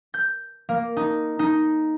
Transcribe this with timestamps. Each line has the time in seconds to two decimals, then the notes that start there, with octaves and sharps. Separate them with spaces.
0.14 G6
0.69 A#3
0.97 D#4
1.39 D#4